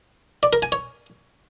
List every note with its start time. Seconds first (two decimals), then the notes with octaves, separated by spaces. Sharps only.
0.43 D5
0.53 A#4
0.62 G#5
0.72 C#5